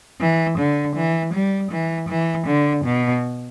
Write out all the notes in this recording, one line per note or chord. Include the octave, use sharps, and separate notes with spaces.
E3
D3
E3
G3
E3
E3
D3
B2